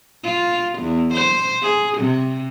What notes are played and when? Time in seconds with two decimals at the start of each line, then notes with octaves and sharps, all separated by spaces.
0.23 F4
0.78 E2
1.13 C5
1.62 G#4
1.98 C3